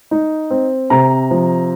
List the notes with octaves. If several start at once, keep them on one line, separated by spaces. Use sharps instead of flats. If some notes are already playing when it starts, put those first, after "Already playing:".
D#4
C4
C3 A#5
F3